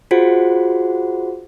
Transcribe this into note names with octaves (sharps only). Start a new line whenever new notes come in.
F4 F#4 G#4 C5 F#5